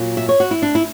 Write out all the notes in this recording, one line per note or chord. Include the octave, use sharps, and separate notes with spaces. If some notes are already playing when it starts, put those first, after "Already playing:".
Already playing: A#2 F#3
E5
C#5
F#4
E4
D4
E4